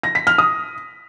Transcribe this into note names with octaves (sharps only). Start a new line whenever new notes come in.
A#6
B6
F6
D#6